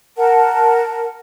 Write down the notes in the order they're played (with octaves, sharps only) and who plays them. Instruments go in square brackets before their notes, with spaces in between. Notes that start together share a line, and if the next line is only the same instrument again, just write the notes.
[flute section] A#4 F#5 A5